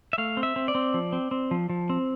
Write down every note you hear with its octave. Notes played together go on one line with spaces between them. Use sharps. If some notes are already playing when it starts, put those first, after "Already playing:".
E5
A3 F5
C4
E5
C4
D5
C4
F3
C4
C4
F3
F3
C4